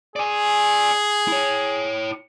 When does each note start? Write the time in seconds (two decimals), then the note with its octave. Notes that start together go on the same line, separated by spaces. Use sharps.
0.16 G#4 D5 G#5
1.28 E4 C#5